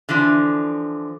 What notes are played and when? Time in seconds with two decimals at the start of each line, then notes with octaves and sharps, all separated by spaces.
0.09 D3 E3 F3 D4